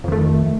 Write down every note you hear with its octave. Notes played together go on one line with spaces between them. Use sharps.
F2 D#3 A3